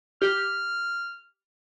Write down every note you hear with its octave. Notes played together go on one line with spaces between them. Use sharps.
G4 F6